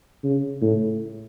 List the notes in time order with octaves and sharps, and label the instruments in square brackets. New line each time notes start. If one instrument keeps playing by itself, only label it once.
[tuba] C#3
A2